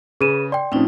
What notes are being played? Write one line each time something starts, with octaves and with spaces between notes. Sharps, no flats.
C#3 G#4 B4 D#7 E7
D5 G5 C6
A2 F3 C4 C#4 D#4